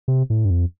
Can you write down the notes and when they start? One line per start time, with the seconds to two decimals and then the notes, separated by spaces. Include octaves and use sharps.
0.08 C3
0.30 A2
0.45 G2
0.50 F2